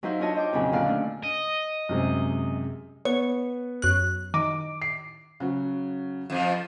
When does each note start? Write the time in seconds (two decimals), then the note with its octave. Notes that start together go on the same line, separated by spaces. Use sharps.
0.03 F#3 D#4 E4 C5 F5
0.20 D4 F4 C#5 D#5 A5
0.35 C5 D#5 G5 D6
0.53 F2 A#2 C#3 F#3
0.72 A#2 D3 D5 F5 F6 F#6
0.88 A3 C#4 D4
1.23 D#5
1.89 F#2 C3 G#3
3.05 B3 C#5
3.82 F#2 F#6
4.34 D#3 D6
4.82 C7
5.40 C#3 F#3 F#4
6.30 F2 F3